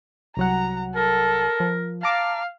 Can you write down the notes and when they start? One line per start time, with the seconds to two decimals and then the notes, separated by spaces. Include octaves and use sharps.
0.37 C2 F#3 F#5 A#5
0.96 A4 A#4
1.60 F3
2.03 F5 A5 A#5 D6